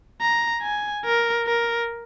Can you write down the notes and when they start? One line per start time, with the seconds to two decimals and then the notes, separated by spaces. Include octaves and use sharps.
0.21 A#5
0.63 G#5
1.05 A#4
1.47 A#4